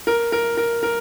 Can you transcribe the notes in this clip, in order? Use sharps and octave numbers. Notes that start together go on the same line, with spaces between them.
A#4
A#4
A#4
A#4